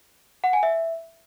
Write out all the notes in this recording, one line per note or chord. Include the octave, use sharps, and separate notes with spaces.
F#5
G#5
E5